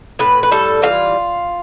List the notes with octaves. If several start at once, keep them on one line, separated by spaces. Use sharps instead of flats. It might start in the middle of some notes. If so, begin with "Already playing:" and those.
A2 B4
B4
G3 A4
E3 F4